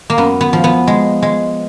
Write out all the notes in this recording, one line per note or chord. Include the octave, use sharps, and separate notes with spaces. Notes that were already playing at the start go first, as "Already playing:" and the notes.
A#3
F#2 B3
B3
F3
B3
G#3
G#3